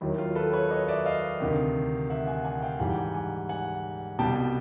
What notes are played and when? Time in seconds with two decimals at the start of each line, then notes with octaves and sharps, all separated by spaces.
0.01 D#2 D#3 F#3 E4
0.18 F4
0.35 A4 B4
0.53 B4 C#5
0.71 C#5 D#5
0.88 D5 E5
1.06 D#5 F5
1.40 D2 C3 D#3
2.10 E5 F#5
2.27 F#5 G#5
2.44 F#5 G#5
2.62 F5 G5
2.80 G#2 E3 G3 F#5 G#5
2.90 G5
2.97 F#5 G#5
3.14 F#5 G#5
3.49 F#5 G#5
4.19 C2 B2 G3 G5 A5